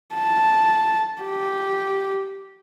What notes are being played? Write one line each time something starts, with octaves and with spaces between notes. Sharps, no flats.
A5
G4